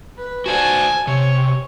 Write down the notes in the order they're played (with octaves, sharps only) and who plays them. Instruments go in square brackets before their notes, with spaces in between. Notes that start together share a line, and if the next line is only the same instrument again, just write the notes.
[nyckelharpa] B4
[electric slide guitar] F#4 C5 D5 [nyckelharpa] G#5 A5
[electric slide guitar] C3 [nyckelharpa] C#5